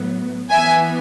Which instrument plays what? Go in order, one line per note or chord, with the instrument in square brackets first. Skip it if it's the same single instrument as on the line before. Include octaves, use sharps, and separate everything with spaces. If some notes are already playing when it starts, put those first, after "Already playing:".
Already playing: [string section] A2 F#3 B3
E3 B3 E5 G#5